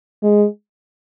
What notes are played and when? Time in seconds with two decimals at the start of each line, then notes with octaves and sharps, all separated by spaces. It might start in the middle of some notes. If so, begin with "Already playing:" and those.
0.23 G#3